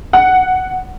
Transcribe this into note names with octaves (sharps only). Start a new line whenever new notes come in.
F#5